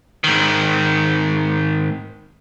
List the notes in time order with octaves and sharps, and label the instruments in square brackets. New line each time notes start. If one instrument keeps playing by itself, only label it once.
[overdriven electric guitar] G#2 D#3